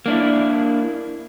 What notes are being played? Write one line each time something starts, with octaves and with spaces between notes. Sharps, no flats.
A#3 D4 E4